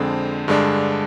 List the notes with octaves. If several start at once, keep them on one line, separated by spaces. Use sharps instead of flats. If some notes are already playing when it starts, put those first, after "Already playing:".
Already playing: F2 D3 G#3 C4
G2 D3 G#3 D4